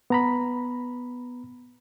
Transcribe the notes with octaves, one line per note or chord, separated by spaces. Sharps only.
B3 A#5 B5